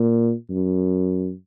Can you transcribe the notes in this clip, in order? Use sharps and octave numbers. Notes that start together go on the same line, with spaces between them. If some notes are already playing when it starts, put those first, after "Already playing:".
Already playing: A#2
F#2